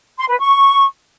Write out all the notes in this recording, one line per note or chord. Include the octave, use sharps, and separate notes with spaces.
C6
B4
C#6